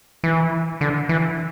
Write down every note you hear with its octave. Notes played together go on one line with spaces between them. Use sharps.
E3
D3
E3